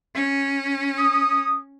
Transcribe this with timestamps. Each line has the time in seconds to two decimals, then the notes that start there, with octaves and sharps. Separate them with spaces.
0.15 C#4
0.99 D#6